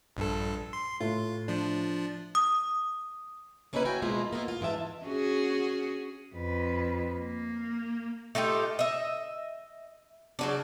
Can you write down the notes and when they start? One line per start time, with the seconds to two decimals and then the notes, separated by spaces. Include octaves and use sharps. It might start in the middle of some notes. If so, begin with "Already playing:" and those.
0.17 A#1 G2 A4
0.73 C6
1.00 A2 F4
1.48 F3 D4
2.35 D#6
3.73 A#3 C#4 D#4 E4 A4 B4
3.85 F#4 E5 G5 G#5
4.02 B2 F3 G#3 A#3 E4 F4
4.33 A#3 B3 E4 F4
4.48 F4
4.61 G#2 E3 G#4 E5 A5
5.05 C#4 F#4 G#4
6.34 F2 B4
7.18 A#3
8.35 A3 D#4 F4 G4
8.79 D#5 E5
10.39 C#3 F#3 D4